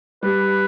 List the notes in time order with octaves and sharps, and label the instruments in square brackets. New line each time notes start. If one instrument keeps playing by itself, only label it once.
[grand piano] G3 [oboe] B4